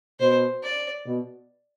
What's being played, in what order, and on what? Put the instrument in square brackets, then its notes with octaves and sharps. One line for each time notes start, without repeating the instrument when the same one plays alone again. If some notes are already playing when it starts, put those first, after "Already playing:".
[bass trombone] B2 [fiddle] C5
[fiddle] D5
[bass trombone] B2